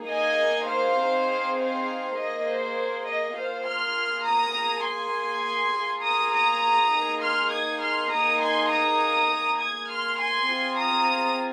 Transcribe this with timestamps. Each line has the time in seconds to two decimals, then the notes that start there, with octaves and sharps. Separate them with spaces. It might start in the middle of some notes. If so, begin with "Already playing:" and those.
Already playing: A#3 D#4 G#4
0.09 D#5 G#5
0.68 C5 F5
0.98 C4 D#4 G#4
1.58 C5 F5
2.17 A#3 G#4 D#5
2.47 C5
3.06 D#5
3.36 A#3 F4 G#4 C5 F5
3.66 C6 F6
4.25 A#5 D#6
4.56 A#3 G#4
4.84 G#5 C6
5.75 A#3 F4 G#4
6.03 A#5 D#6
6.33 A#5 D#6
6.93 A#3 D#4 G#4
7.22 C6 F6
7.52 D#6 G#6
7.82 C6 F6
8.11 A#3 D#4 G#4 A#5 D#6
8.41 G#5 C6
8.71 A#5 D#6
9.30 A#3 G#4
9.60 D#6 G#6
9.90 C6 F6
10.20 G#5 C6
10.49 C4 F4 G#4
10.78 A#5 D#6